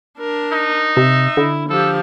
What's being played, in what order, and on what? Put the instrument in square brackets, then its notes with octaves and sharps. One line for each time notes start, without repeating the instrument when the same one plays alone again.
[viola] D4 A#4
[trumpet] D#4
[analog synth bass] C3 [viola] E5
[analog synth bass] D3 [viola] E4
[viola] F3 G4 [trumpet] A4